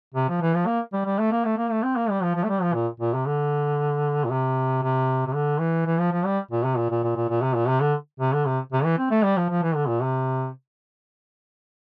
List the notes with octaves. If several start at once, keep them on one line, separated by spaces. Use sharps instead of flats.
C3
F3
E3
F3
A#3
G3
G3
A3
A#3
A3
A#3
A3
C4
A#3
G3
F3
F3
A3
G3
F3
A#2
A#2
C3
D3
A#2
C3
C3
C3
D3
E3
E3
F3
F3
G3
A#2
C3
A#2
A#2
A#2
A#2
A#2
C3
A#2
C3
D3
C3
D3
C3
C3
E3
C4
A3
G3
F3
F3
E3
D3
A#2
C3